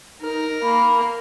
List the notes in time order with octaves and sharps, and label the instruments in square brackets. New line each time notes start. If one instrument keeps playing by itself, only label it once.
[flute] D#4 [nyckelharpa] A#4
[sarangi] A#3 [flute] B5